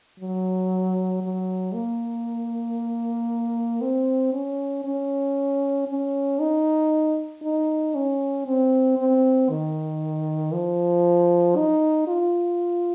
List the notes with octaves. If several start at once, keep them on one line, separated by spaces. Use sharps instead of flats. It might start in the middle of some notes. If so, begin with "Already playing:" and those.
F#3
F#3
A#3
C4
C#4
C#4
C#4
D#4
D#4
C#4
C4
C4
D#3
F3
D#4
F4